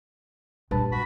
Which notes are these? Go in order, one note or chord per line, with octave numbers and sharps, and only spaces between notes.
A#1 G2 A#3 B4 A5
F#4 B5